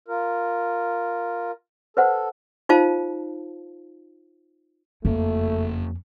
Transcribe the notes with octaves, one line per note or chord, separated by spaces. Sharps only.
F4 A#4
A4 B4 C5 F#5
D#4 F4 C5 F5 A5
F#1 F2 A3 A#3